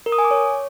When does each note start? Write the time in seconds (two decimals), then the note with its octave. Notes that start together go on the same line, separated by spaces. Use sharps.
0.06 A#4
0.12 D#6
0.19 G#5
0.25 D6
0.31 C#5